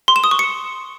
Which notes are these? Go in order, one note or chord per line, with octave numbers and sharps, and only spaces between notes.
C6
E7
D#6
C#6
C#7